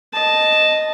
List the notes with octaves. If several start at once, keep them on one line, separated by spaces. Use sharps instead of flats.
D#5 A5